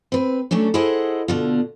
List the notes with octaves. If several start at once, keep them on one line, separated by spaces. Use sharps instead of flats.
C4 B4
F#3 A3 C#4 D4
E4 G#4 A4 C5 D#5 F#5
B2 D3 F4